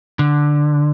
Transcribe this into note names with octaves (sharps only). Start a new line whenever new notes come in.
D3